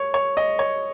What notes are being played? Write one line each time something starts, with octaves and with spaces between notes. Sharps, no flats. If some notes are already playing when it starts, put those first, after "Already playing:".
Already playing: C#5
C#5
D#5
C#5